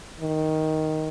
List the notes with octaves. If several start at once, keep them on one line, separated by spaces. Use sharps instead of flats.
D#3